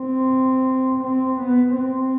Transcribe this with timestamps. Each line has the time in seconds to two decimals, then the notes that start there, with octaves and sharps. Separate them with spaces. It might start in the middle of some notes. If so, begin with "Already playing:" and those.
Already playing: C4
1.03 C4
1.39 B3
1.75 C4